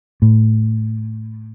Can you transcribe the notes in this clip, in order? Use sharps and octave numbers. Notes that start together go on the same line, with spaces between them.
A2